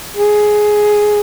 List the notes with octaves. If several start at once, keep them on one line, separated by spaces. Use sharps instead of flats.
G#4